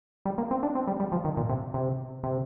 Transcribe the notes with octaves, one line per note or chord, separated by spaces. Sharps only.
G3
A#3
C4
D4
C4
G3
G3
F3
D#3
A#2
C3
C3
C3